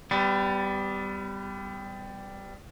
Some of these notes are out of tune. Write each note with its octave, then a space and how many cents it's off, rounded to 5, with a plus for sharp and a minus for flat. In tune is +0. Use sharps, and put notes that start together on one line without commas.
G3 +0 B3 +35